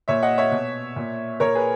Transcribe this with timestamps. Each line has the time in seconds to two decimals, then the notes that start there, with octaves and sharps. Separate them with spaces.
0.08 A#2 C#5 E5
0.23 D#5 F#5
0.38 C#5 E5
0.52 B2
0.96 A#2
1.40 A#2 A#4 C#5
1.55 G#4 B4